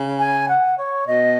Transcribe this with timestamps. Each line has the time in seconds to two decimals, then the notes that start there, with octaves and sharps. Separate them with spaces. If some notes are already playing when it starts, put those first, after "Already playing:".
Already playing: C#3
0.19 G#5
0.49 F#5
0.78 C#5
1.07 B2 D#5